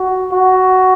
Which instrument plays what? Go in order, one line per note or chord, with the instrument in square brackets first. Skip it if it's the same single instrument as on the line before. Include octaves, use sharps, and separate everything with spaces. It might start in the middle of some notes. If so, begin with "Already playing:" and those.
Already playing: [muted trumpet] F#4
F#4